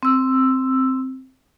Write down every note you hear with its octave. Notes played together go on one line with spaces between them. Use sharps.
C4 E6